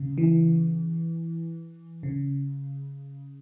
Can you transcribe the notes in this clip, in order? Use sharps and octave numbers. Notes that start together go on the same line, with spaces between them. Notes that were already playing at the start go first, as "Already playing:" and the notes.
Already playing: C#3
E3
C#3